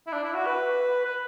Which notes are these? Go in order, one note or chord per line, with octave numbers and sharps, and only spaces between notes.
E4
D4
E4
F#4
B4
B4